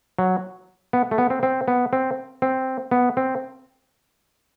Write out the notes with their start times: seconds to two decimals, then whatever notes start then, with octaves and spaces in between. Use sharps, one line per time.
0.19 F#3
0.93 B3
1.11 A3
1.18 B3
1.30 C4
1.43 C4
1.68 B3
1.93 C4
2.42 C4
2.91 B3
3.17 C4